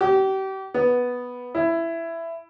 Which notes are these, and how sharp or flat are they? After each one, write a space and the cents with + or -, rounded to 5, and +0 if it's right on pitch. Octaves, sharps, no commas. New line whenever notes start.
G4 -35
B3 -5
E4 +10